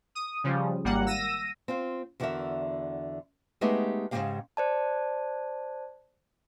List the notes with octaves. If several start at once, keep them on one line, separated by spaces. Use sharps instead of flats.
D#6
C#3 F3 G3
G#1 G3 A#3 F#5
E6 A#6 D#7
C4 F4 C5
E2 D3 F#4 A4 A#4 E5
G#3 A3 B3 D#4 G4 G#4
G#2 C#3 G#3 A#3 G4 F5
C5 D5 A5